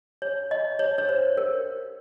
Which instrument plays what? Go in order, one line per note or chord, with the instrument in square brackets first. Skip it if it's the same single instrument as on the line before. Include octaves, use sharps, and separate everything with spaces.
[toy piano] C#5
D#5
C#5
C#5
C5
A#4